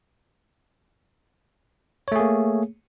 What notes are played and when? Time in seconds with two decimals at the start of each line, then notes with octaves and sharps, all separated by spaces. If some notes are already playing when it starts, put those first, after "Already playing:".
2.08 C#5
2.12 A3
2.16 G#4
2.20 A#3